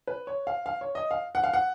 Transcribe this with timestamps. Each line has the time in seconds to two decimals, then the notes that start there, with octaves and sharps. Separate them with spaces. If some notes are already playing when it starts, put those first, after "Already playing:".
0.07 B4
0.27 C#5
0.47 F5
0.66 F5
0.81 C#5
0.95 D#5
1.11 F5
1.35 F#5
1.44 F5
1.53 F#5